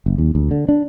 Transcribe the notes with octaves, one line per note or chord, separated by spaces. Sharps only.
F#1
D#2
D2
D3
D4